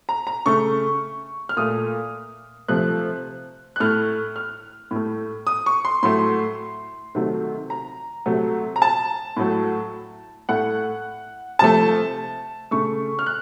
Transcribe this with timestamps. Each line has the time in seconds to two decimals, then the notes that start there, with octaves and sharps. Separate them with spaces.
0.09 A#5
0.27 A#5
0.46 C#3 A3 C#6
1.49 F6
1.57 A#2 A3 D#6
2.68 C3 F3 A3 F#6
3.76 F#6
3.80 A2 A3 F6
4.36 F6
4.91 A2 A3
5.47 D#6
5.66 C#6
5.85 C6
6.03 A2 F#3 A3 C6
7.15 C3 D#3 F#3 A3
7.70 A#5
8.26 C3 F#3 A3
8.76 A#5
8.82 A5
9.37 A2 F#3 A3
10.49 A2 A3 F#5
11.59 C3 F3 A3 A5
12.71 C#3 A3 C#6
13.19 F6
13.26 F#6